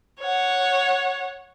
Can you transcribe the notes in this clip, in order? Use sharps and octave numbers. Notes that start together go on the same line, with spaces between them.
C#5 F#5